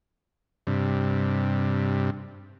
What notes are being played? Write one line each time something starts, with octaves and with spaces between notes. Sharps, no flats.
G2 C3